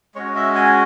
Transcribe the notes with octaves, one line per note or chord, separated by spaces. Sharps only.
G#3 C#4 F#4 C#5
E5
G#5